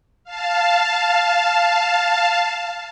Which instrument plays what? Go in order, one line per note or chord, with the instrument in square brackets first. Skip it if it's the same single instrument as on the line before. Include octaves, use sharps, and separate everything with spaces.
[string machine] F5 A5